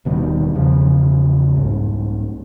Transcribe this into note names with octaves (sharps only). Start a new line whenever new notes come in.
D#1 B2 D#3 G3
E2 C#3 F3
C2 G#2